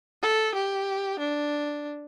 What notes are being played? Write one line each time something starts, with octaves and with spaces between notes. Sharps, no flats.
A4
G4
D4